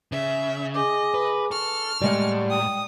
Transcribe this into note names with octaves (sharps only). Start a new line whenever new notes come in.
C#3 E5
G#4 D#5 G#5 D6
B4
A4 C#6 F6
A2 G3 G#3 F#5
G5 D#6